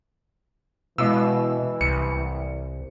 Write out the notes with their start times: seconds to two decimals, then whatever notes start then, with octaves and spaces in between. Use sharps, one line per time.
0.98 B2 E3 G#3 E4 F5 E6
1.81 C2 C#7